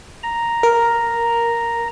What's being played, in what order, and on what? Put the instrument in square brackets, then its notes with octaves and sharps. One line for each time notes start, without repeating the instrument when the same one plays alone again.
[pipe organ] A#5
[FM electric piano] A#4